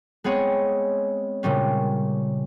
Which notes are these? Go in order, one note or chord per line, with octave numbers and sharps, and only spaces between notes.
G#3 B3 C4 G#4 C#5
A#2 C#3 G3 C#4